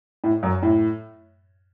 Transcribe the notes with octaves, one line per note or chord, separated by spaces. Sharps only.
A2
F#2
A2